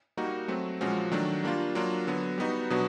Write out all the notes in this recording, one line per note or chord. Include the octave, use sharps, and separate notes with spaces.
G3 A#3 D#4 F#4
F#3 A3 C4
A#2 F3 G#3 C#4 F#4
D#3 F#3 A3 D4
G3 A#3 D4 F4
F#3 A#3 D4 F4
D3 F#3 B3
G3 B3 D#4 F#4
B2 F#3 B3 D4 F#4